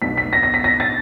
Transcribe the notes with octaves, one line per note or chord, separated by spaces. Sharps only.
B1 B2 B6
B6
A#6
A#6
B6
A#6
A6